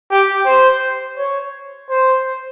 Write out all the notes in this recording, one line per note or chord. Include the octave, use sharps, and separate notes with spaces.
G4
C5
C#5
C5